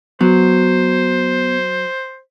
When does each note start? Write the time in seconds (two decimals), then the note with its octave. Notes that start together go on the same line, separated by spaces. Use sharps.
0.21 F#3 B3 C5